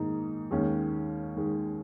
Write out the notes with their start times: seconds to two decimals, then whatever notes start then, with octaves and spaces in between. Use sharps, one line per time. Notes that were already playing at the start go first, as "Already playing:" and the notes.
Already playing: G#2 D#3 A#3 D#4
0.51 D#2 D#3 G#3 C#4
1.36 D#3 G#3